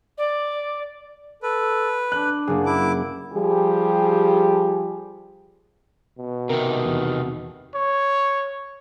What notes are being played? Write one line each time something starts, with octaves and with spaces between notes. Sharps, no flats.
D5
A4 B4
D4 F#6
F#1 A#3 G#4
E4 D6
F3 G3 G4 G#4
B2
C3 D#3 A#4
E2
C#5